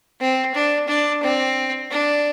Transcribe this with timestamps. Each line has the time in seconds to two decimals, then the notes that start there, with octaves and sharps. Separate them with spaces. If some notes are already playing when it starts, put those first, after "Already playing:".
0.21 C4
0.54 D4
0.88 D4
1.23 C4
1.91 D4